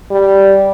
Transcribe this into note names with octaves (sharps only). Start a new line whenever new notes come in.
G3